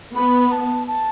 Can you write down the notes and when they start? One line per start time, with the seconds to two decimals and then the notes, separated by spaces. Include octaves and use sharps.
0.15 B3 B5
0.52 A5
0.87 A5